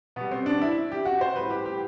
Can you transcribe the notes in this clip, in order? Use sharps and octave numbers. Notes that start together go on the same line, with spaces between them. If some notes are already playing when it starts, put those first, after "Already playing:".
B2 G3 B3
C4
D4
E4
G4
F#4
C5
A2 G3 B4
G4
G4